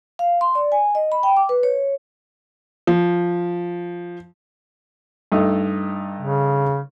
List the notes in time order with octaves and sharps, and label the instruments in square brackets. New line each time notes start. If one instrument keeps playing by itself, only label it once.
[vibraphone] F5
C6
D5
G#5
D#5
B5
G5
D6
B4
C#5
[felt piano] F3
[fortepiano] G2 A3 D#4
[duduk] C#3